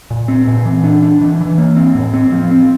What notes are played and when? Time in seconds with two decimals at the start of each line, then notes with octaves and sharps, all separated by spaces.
0.11 A#2
0.28 C4
0.48 A#2
0.65 E3
0.84 D4
1.02 D4
1.21 E3
1.40 E3
1.58 A#3
1.76 C4
1.95 A2
2.14 C4
2.32 F3
2.51 C4